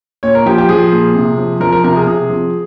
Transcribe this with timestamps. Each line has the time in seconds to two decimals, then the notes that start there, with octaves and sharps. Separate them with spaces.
0.23 A#2 C#5
0.35 A#4
0.46 F3 G4
0.58 G4
0.69 F3 G#4
0.92 A#2
1.15 C3
1.38 F3
1.60 F3 A#4
1.73 A#4
1.84 C3 A#4
1.96 G#4
2.06 C3 G#4
2.30 F3